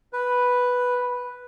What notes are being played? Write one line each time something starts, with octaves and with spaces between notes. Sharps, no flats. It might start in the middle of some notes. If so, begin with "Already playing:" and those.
B4